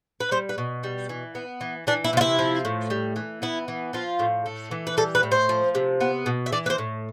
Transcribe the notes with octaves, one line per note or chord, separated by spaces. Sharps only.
B4
G3 C5
B4
B2
G3
E3
B3
E3
E3 D4
E4
C3 F4
E4
F3
A2
G3
E3
B3 E4
E3
F3 F4
A2
A3
E3
B4
G3 A4
B4
A2
C5
F3
C3
B3
B2
E5
E3 D5
B4
C5
A2